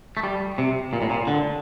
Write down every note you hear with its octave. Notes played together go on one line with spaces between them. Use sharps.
A3
G3
C3
A#2
A2
A#2
D3